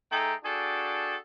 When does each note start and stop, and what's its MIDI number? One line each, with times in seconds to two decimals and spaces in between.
0.10 0.33 57
0.10 0.33 63
0.10 0.33 68
0.10 0.33 69
0.10 0.33 79
0.10 0.33 82
0.44 1.16 62
0.44 1.16 66
0.44 1.16 68
0.44 1.16 69
0.44 1.16 79
0.44 1.16 81